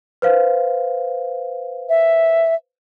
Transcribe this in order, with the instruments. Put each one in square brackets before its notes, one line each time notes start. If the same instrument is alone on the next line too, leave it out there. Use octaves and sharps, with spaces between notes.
[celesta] B4 C5 F5
[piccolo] E5